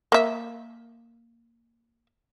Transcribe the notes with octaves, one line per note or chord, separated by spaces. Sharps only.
A#3 E5